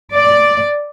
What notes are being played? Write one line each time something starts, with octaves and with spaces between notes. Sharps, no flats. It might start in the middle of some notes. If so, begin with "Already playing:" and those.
D5